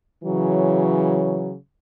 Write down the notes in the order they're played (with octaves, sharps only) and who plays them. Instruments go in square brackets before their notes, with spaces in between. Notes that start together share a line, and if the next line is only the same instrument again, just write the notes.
[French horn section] C#3 E3 F#3